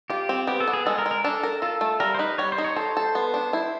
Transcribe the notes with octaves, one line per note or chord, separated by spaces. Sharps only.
F4 G4
C4
B3 G4
A4
B3
G#4
G#3 A4
A#4
G#3
A#4
D4 A4
A#4
F4 A4
A3
G3 A#4
C5
D#4 B4
G3 C#5
C5
D#4
C#5
A4 C5
A4
B3
D4
E4